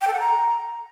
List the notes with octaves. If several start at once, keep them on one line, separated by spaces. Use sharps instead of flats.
G5
A4
F#5
A#5